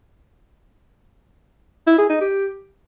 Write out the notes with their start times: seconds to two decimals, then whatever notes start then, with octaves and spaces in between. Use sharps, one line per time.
1.87 E4
1.98 G#4
2.09 D#4
2.21 G4